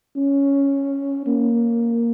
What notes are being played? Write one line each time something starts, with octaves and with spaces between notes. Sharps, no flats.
C#4
A#3